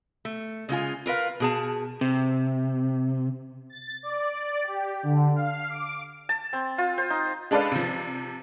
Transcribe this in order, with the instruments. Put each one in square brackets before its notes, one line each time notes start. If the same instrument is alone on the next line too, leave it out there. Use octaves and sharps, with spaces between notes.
[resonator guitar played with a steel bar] A3
C#3 G#3 F4 G#5
F4 A#4 B4 F5
B2 G#4 A5
[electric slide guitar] C3
[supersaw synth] A6
D5
G4
D3
F5
D6
[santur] A5
C4
F4
C5
D#4
[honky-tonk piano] G#3 D4 A4 B4 D5 F5
C3 F3